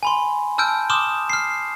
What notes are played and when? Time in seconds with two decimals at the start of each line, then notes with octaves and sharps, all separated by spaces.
0.03 G#5 B5 C6
0.58 A5 E6 F6 G6 D7
0.90 C6 D6 D#6 F6 G6 E7
1.30 F6 C7